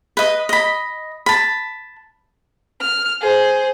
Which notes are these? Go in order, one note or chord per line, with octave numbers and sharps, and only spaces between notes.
B4 D#5
D#5 B5
A5 B5
F6
G#4 C5